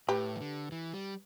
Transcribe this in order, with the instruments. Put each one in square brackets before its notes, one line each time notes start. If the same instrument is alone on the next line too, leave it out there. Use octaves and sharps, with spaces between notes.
[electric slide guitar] A2 [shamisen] G4 B4
[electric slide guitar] E3
D3
E3
G3